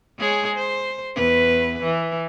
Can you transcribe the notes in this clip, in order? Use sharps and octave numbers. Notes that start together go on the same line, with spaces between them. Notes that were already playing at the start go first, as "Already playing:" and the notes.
G#3 G#4 C#5
C5
E2 B4
E3